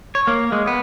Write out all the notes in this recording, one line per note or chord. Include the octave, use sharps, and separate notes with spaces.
C#5
A#3
G#3
B3